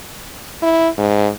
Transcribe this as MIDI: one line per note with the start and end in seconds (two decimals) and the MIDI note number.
0.62 0.89 64
0.98 1.29 44